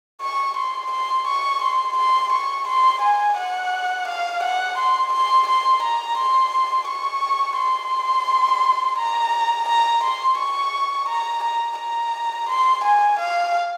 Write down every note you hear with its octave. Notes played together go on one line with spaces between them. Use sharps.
C#6
C6
C6
C#6
C6
C6
C#6
C6
G#5
F#5
F5
F#5
C6
C6
C6
A#5
C6
C#6
C6
A#5
A#5
C6
C#6
A#5
A#5
A#5
C6
G#5
F5